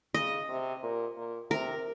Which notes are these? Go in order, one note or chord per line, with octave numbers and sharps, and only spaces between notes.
C#3 D#5
C3
A#2
A#2
C3 A#4